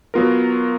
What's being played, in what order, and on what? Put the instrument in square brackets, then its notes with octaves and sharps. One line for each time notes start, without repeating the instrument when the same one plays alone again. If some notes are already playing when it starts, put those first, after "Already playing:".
[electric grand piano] F#3 B3 F4 A#4